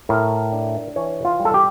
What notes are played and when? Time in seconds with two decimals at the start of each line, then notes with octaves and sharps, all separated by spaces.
0.09 A2 A#4
0.53 D4
0.96 E3 C#5
1.25 F4
1.40 G3
1.45 A4
1.54 G4